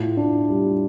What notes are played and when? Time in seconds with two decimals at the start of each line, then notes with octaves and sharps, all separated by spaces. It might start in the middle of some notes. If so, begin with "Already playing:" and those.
Already playing: A2 F4
0.17 D4
0.49 G3